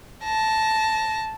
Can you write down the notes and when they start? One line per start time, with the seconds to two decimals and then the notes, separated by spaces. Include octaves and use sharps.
0.24 A5 A#6